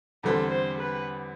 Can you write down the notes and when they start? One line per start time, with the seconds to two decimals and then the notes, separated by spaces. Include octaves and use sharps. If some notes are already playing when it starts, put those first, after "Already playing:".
0.23 E2 D3 G3 C4 A4
0.51 C5
0.80 B4